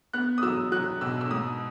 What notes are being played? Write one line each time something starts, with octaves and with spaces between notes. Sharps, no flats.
B3 F#6
D#6
F#3 E6
F#3 F#6
B2 E6
E6
G#2 D#6